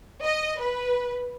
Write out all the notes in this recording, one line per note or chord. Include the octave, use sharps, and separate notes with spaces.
D#5
B4